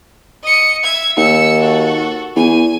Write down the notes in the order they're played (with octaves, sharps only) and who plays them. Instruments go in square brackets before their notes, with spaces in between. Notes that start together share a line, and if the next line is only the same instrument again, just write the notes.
[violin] D#5 C#7
E5 G#6
[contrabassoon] D#2 [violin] E6 C#7
[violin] F#4 A4
[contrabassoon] E2 [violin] G#5